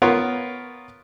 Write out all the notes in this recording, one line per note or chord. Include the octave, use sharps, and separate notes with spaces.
B3 F4 A#4 C#5